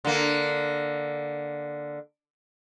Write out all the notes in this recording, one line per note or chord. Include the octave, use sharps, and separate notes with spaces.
D3 A#3